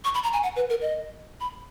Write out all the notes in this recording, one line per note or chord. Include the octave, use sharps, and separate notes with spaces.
C#6
B5
A#5
G#5
F#5
B4
A#4
D#5
B5